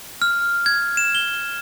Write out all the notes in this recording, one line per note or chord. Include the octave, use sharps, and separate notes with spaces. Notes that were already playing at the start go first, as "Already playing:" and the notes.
F6
G#6
E7
G7